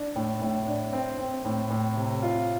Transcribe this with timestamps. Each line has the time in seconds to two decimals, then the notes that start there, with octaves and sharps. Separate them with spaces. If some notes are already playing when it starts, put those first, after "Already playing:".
Already playing: D4
0.16 A2
0.42 A2
0.67 D4
0.93 C4
1.19 C4
1.45 A2
1.70 A2
1.96 C3
2.22 F4